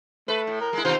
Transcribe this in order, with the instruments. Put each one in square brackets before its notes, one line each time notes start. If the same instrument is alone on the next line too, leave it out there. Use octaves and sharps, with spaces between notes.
[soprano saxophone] A3 [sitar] B4
[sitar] A2
[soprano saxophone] A#4
[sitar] G#3 E4
[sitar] B2 D#3 F4 [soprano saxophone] C5